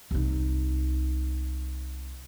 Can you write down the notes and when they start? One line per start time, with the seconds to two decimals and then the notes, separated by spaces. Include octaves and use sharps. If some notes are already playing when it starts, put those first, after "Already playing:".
0.11 C2 D#4